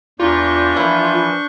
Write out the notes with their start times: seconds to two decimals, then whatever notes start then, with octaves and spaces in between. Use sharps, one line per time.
0.20 E2 D4 F4 G4 A#5 C#6 G6
0.76 E3 F3 A#3 E4